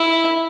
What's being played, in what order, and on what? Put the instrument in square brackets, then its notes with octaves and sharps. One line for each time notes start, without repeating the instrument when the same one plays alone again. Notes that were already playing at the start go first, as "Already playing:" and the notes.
Already playing: [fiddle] E4